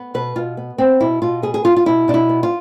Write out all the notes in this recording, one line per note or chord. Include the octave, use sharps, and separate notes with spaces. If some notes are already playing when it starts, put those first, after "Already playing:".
Already playing: B3
B2 B4
B2 F4
B3
B3 C4
B2 E4
B2 F4
B3 G#4
G#4
B3 F4
F4
B2 E4
B2 D4
E4
B3
F4